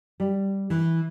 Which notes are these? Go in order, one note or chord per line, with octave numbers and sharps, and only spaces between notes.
G3
E3